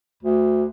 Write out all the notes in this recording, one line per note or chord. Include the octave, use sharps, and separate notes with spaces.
D2